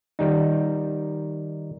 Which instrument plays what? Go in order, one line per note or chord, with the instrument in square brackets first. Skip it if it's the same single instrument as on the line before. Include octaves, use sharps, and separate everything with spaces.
[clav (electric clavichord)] D#3 G3 D#4